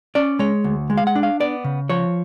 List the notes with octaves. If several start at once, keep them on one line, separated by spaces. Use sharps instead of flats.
C#4 D5
G#3 C#5
D2
G#3
F5
F#5
D4
F5
B3 D5
C#3
F3 C#5